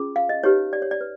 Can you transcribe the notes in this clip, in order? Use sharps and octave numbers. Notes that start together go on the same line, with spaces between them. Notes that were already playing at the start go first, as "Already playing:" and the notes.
Already playing: C#4 F4 G#4
F5
D#5
D#4 G4 B4 C#5
D5
C#5
D5
B4